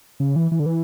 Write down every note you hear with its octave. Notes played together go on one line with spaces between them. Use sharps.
C#3
E3
E3
D3
E3